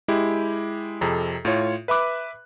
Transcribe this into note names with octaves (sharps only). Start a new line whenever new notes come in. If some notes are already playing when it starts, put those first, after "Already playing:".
G#3 E4 G4
F2 C3 G#4 A4 A#5
A2 F4 C#5
B4 E5 B5 D6 F#6